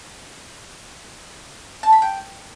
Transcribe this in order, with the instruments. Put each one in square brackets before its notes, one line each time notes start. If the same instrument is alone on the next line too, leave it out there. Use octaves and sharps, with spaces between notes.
[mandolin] A5
B5
G5